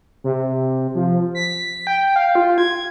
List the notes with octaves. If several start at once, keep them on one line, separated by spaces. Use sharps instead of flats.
C3
F3
B6
G5
F5
F4
G#6